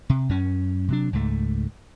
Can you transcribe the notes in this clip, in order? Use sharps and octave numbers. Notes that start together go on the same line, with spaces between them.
C3
F#2 C#4
C3 F#3 D4
C#2 G#2 A3